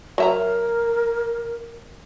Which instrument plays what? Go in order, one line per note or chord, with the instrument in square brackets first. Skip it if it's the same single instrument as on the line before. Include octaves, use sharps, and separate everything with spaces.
[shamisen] F#3 E5 A#5 [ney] A#4